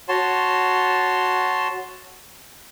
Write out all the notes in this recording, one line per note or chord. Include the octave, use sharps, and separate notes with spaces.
F#4 C#5 A5 C6